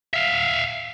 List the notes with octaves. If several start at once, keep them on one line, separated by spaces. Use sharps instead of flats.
E5 F5